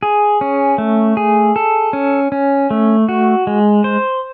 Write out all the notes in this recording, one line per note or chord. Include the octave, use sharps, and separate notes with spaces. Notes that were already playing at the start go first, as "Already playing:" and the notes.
G#4
C#4
A3
G#4
A4
C#4
C#4
A3
F#4
G#3
C5